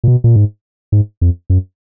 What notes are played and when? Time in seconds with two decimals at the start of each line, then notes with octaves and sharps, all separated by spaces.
0.04 A#2
0.08 B2
0.24 A#2
0.36 G#2
0.92 G#2
1.21 F2
1.50 F#2